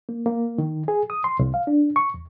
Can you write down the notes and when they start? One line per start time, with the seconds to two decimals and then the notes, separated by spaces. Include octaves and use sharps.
0.09 A#3
0.26 A#3
0.58 D#3
0.88 G#4
1.10 D#6
1.24 C6
1.39 C2
1.54 F5
1.67 D4
1.96 C#6
2.14 E2